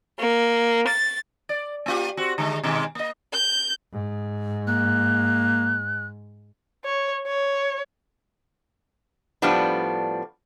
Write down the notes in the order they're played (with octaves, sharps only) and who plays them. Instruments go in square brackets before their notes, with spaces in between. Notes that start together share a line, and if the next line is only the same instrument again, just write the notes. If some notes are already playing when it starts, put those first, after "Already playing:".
[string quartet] A#3
A6
[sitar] D5
A#3 F4 G4
C4 F#4
D3 G#3
B2 D#3 G#3
A#3 D#5
[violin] G6
[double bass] G#2
[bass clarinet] A#3 [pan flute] F#6
[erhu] C#5
C#5
[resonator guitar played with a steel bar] A2 F3 G3 B3 D4